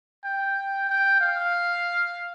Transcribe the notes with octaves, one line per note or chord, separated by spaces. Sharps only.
G5
G5
F5